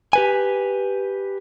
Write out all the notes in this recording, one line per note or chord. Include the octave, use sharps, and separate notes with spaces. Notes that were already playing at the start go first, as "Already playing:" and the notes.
G4 B4 G#5